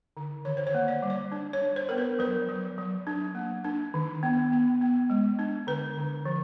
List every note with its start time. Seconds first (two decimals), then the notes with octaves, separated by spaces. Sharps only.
0.17 D3
0.45 D#3 C#5
0.57 C5
0.67 C#5
0.74 A#3
0.88 D5
1.03 G3
1.10 D5
1.32 D4
1.53 C#5
1.61 D4
1.76 C5
1.89 B3 A#4
1.98 B4
2.19 F#3 B4
2.49 F#3
2.78 F#3
3.07 D4
3.35 A#3
3.64 D4
3.94 D#3
4.23 B3
4.52 B3
4.81 B3
5.10 G#3
5.39 D4
5.67 D3 B4
5.97 D3
6.25 F3